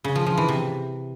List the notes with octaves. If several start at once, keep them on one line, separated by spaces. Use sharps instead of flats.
C#3
F3
F3
E3
C3